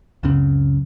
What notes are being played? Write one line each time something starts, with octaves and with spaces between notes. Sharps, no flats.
C#2 F#2 C#3 C4